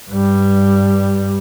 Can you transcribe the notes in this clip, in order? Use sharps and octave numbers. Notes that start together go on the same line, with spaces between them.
G2 G3